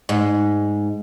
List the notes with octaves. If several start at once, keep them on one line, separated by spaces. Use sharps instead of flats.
G#2